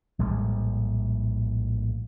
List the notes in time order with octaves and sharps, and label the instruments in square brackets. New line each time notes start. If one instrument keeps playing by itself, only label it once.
[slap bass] A#1 A2 G3 G#3